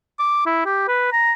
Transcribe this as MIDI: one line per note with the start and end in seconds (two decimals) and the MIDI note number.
0.19 0.42 86
0.46 0.61 64
0.66 0.85 67
0.88 1.11 71
1.13 1.33 82